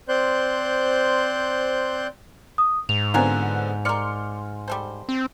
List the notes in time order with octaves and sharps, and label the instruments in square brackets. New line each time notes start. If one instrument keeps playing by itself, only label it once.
[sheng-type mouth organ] C4 C5 D5 C6 F#6 G6
[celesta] D#6
[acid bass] G#2 [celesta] F7
[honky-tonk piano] D3 B3 C4 [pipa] F4 A#4 G#5
[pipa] A#4 D5 [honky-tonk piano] C6 F6 C#7
[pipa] G3 A4 C5
[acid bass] C4